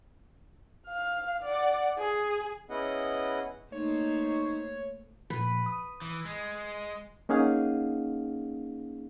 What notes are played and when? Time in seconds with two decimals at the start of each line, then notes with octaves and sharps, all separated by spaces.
0.88 F5 F6
1.43 D5 F#5
1.98 G#4
2.70 B3 C#4 E4 G#4 D#5 F#5
3.72 A3 A#3 D#4 C5 C#5
5.30 A#2 F3 B4
5.66 D#6
6.02 E3
6.25 G#3
7.29 A#3 C#4 D#4 G#4 F5 F#5